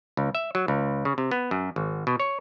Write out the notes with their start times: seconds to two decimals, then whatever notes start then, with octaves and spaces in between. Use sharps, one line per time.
0.17 C#2
0.35 E5
0.55 F#3
0.68 C#2
1.05 C#3
1.18 C3
1.31 B3
1.51 F#2
1.76 G#1
2.07 B2
2.20 C#5